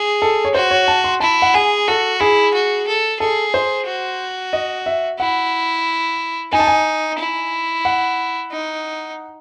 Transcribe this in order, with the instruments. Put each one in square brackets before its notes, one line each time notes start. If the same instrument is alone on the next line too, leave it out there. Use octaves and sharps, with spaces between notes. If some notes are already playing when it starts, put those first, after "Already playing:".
Already playing: [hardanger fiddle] G#4
[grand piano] A4
C#5
[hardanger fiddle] F#4 [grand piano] C5
[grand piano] C#5
A5
C6
[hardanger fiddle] E4 [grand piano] A5
[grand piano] F#5
[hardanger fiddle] G#4 [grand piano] G#5
[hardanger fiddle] F#4 [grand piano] A4
[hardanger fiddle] E4 [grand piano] G#4
[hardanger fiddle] F#4
A4
[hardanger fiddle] G#4 [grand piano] A4
[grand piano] C5
[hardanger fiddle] F#4
[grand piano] D#5
E5
[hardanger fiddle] E4 [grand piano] F#5
[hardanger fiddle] D#4 [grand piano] G#5
[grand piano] A5
G#5
[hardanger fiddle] E4
[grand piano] F#5
[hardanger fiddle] D#4